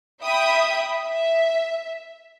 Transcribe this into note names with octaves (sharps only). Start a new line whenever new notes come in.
E5 G5 B5 D#6
E5